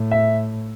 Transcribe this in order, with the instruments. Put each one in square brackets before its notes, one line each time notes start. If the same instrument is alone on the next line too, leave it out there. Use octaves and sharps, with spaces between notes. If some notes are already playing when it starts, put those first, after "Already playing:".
Already playing: [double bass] A2
[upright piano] E5